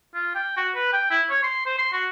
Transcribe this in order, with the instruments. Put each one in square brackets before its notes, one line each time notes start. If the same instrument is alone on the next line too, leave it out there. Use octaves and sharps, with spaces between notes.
[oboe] F4
G5
F#4
B4
G5
E4
C#5
C6
C5
C6
F#4